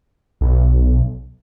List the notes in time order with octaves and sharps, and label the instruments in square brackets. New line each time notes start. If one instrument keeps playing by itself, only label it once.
[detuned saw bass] B1